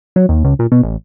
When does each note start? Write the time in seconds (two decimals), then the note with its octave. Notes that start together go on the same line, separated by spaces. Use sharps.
0.16 F#3
0.29 D#2
0.44 C#2
0.59 A#2
0.72 B2
0.83 A1